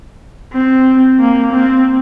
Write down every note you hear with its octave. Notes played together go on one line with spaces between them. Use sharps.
C4
A#3
C4